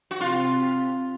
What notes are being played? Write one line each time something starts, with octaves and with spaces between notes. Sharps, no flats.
F#4
C3 F4